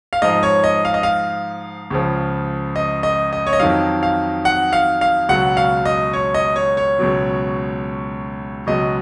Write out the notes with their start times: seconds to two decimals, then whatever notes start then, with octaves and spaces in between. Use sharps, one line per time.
0.13 F5
0.22 G#2 F3 D#5
0.43 C#5
0.64 D#5
0.85 F5
0.94 D#5
1.03 F5
1.90 C#2 C#3 F3
2.76 D#5
3.03 D#5
3.33 D#5
3.47 C#5
3.53 D#5
3.60 F2 D#3 F#3 F5
4.03 F5
4.45 F#5
4.73 F5
5.01 F5
5.29 C#2 B2 F#3 F#5
5.57 F5
5.85 D#5
6.13 C#5
6.34 D#5
6.56 C#5
6.77 C#5
6.99 C#2 B2 F#3
8.67 C#2 B2 F#3 D#5